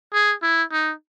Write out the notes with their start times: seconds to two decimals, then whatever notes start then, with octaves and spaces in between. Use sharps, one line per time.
0.13 G#4
0.42 E4
0.72 D#4